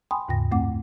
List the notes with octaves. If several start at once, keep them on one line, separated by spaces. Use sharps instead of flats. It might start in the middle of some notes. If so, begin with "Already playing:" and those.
G5 G#5 B5 C6 D#6
D#2 G#2 C#3 G5 A#6
F#2 A3 C4 F#5 D6